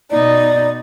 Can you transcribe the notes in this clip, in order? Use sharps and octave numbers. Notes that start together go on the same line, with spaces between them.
B2 D#4 D5